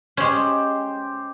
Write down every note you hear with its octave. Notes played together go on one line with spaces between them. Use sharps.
G#3 C#4 G4 C5